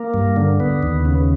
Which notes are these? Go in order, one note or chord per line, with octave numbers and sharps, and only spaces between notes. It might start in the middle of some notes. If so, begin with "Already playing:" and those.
Already playing: A#3
G2
D3
B3
D#2
C#3